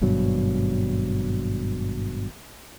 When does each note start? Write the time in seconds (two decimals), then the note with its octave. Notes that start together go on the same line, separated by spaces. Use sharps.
0.01 G#1 G2 B2 F#3